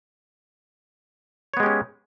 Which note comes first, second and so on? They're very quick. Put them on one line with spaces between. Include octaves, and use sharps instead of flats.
C#5 B3 G#3 G4 C#4